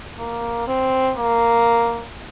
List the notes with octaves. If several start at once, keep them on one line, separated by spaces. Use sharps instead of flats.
A#3
C4
A#3